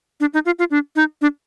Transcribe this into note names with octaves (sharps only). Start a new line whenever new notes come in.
D4
D#4
F4
F4
D4
D#4
D4